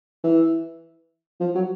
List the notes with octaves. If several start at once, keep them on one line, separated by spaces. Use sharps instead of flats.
E3
F3
F#3